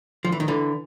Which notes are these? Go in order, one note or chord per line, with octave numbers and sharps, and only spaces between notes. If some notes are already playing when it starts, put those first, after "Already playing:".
F3
E3
D#3
D3 E3